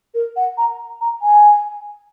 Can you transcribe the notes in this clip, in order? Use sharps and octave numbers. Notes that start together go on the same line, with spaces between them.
A#4
F#5
A#5
A#5
G#5